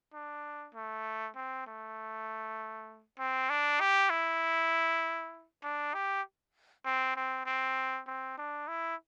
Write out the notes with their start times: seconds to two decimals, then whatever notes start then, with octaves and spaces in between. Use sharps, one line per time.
0.14 D4
0.74 A3
1.36 C4
1.67 A3
3.19 C4
3.50 D4
3.80 G4
4.10 E4
5.63 D4
5.94 G4
6.85 C4
7.16 C4
7.46 C4
8.07 C4
8.38 D4
8.68 E4